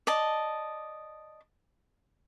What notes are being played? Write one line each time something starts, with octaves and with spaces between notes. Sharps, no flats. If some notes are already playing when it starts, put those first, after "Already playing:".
D5 D#5 A5